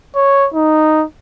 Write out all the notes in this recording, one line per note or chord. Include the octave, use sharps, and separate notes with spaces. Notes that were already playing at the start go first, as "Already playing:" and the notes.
C#5
D#4